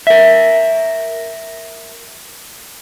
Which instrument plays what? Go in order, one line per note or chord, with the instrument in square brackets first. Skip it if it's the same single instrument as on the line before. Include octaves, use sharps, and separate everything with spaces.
[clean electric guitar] A#4 E5